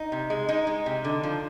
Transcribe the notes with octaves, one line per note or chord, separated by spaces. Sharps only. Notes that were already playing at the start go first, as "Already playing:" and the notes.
Already playing: D#4
C3
G#3
G#3 D#4
G#3
C3
D3
F3